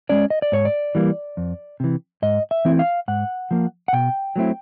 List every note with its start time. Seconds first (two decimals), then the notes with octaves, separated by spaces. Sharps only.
0.09 G#3 C#4 D5
0.30 D#5
0.42 D5
0.52 G#2 C#5
0.65 D5
0.95 E3 G3 A#3
1.37 F2
1.80 C3 E3
2.22 G#2 D#5
2.51 E5
2.65 E3 A3 C4 E4
2.79 F5
3.08 G#2 F#5
3.51 F3 A#3
3.88 F#5
3.93 B2 G5
4.36 F#3 A3 C4 E4